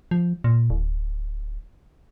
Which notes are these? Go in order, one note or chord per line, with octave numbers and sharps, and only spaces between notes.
F3
A#2
D1